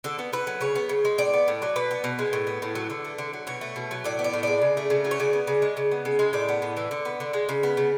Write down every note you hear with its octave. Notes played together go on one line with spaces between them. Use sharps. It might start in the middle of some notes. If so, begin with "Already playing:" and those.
D3 A4
B3
D3 B4
F#3
C#3 C#5
B3
C#3
G#3
A2 D5
B3
A2
F#3
B2 B4
B3
B2
G#3
A2
B3
A2
F#3
D3
A3
D3
F#3
B2 C#5
A3
B2
F#3
A2 D5
B3
D5
A2
G#3 D5
C#3
A3
C#3
F#3
C#5
C#3 D5
B3
C#3
G#3
C#3
B3
C#3
G#3
A2 D5
B3
A2
E3
D3
B3
D3
G#3
C#3
B3
C#3